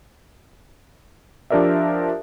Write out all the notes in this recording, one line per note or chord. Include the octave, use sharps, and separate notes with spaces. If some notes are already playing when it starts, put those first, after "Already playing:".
F3 D4 G4 A#4 D5 E5